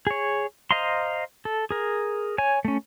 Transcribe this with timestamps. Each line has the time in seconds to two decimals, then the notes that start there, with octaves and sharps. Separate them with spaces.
0.07 G#4 C#5
0.71 C5 D#5 F5 A#5 C6
1.45 A4
1.71 G#4 A#4
2.38 C#5 G#5
2.65 A3 C#4